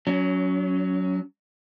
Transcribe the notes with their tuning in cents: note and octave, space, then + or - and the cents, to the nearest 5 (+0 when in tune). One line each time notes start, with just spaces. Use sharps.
F#3 +0 C#4 +25